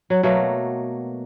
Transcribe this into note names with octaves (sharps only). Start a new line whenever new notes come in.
F#3
B2 F#3 A3 A#3